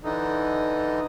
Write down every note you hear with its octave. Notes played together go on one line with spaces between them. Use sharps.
D3 E3 D#4